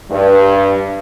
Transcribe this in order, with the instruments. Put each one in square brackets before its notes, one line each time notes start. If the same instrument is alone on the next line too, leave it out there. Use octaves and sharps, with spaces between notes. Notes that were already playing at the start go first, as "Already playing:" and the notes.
[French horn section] G2